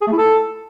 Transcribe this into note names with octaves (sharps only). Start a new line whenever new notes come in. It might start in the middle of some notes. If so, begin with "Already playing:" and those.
G#4
A3
E4
A4